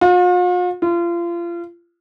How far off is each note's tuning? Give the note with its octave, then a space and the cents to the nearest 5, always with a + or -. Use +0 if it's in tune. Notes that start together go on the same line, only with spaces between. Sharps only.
F4 +45
F4 -30